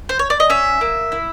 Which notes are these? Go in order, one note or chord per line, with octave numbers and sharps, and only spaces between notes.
C5
C#5
D5
D#5
C#4 E5
A#3
E4